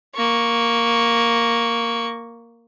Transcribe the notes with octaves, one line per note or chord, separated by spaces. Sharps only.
A#3 C#6